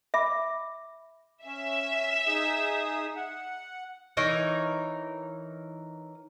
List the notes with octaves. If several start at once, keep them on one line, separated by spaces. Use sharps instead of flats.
E5 B5 D6 A#6
C#4 E5
D#4 G#4 D#6
F#5
E3 D#4 A#4 C#5